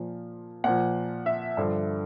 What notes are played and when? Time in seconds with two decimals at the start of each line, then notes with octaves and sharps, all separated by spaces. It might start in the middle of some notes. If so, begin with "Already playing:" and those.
Already playing: A#2 F3
0.64 A#2 F3 F#5
1.26 E5
1.57 G2 D3 F3